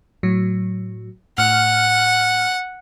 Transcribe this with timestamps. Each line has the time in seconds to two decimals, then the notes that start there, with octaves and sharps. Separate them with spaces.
0.23 A2 F#3
1.38 A2 F#5 F6